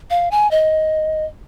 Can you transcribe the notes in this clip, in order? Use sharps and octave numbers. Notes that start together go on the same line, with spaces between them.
F5
G#5
D#5